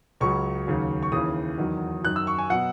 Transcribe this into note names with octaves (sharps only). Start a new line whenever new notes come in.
C#2 C#3 F#3 C#6
D#2 C#3 F#3
C#6
D#2 C#3 E3 D#6
E2 D#3 F#3
F#2 D#3 F#3 F#6
E6
C#6
G#5
B2 F#3 F#5